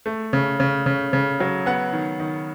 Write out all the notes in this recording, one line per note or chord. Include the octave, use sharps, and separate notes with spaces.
A3
C#3
C#3
C#3
C#3
F#3
B3 F#5
D#3
D#3